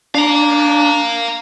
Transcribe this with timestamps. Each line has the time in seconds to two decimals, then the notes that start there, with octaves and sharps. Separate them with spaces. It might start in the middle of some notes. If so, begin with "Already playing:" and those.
0.14 D4 F5 A#5